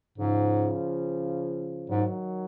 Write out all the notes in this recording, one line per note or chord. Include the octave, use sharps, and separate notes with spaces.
G#2 C#3 F3
G#2 D#3 F#3